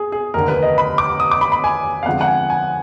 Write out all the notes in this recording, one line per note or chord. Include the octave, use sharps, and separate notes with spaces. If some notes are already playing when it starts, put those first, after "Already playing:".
Already playing: G#4
G#4
F1 D#2 D3 A#4
B4
D#5
B5
D6
D#6
D6
B5
B5
G#5
F5
F2 D3 F3 G#3 F#5
F#5
G#5
G#5